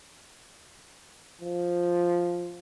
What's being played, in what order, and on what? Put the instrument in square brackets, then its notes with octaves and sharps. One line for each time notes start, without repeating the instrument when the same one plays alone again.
[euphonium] F3